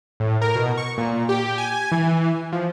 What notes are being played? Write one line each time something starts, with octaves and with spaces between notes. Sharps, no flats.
A2
A#4
B2
C#6
A#2
G4
G#5
E3
F3